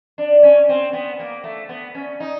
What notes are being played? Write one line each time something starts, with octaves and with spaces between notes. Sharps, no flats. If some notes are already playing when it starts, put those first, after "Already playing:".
D4
C#4
C4
B3
A#3
A3
B3
C#4
D#4